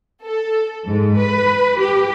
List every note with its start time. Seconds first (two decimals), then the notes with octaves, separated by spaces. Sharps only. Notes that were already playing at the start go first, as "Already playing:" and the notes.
0.22 A4
0.87 G#2
1.19 B4
1.79 G4